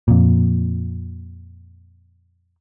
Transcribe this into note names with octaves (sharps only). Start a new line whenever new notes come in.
F2 A#2